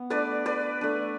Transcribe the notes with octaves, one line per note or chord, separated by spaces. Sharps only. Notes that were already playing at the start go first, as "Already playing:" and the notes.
Already playing: B3
A3 D4 B4 D5
B4 D5
A3 D4